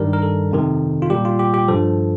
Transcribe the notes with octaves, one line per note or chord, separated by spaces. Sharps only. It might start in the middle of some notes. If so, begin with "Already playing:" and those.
Already playing: G2 D#3 G3 A#4
A#4
A4
F2 C3 D#3
F4
A#2 G3 G4
F4
G4
G4
G2 F3 A4